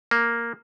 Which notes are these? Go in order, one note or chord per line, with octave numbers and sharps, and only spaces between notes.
A#3